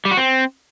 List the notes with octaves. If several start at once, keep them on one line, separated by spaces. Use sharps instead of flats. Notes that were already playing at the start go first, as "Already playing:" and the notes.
G3
F#4
C4